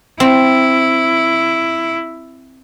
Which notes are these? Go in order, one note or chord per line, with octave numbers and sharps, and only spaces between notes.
C4 E4